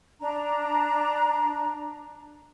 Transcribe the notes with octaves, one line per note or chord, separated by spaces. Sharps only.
D4 A#5